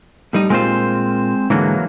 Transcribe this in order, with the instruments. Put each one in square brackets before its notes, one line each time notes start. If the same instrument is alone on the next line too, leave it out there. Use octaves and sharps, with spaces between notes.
[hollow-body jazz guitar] A2 G3 D#4
[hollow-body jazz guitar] A#2 F4 [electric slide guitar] G#3 C4 C5
[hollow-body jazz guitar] G#2 D3 [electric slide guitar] E3 F#3 A#3